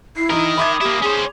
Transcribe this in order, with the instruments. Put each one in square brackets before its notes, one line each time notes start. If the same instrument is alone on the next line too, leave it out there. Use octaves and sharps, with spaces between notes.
[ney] E4 [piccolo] C7
[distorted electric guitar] D#3 A#4 [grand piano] E3 D#4 [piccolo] D#6
[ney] E5 [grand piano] B5 D6 G#6
[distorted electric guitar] A#3 E4 [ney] G4
[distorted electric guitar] C#4 C5 [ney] G#4